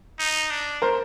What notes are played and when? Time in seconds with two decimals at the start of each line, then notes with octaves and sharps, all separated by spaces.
0.19 D#4
0.50 D4
0.82 A#4 C5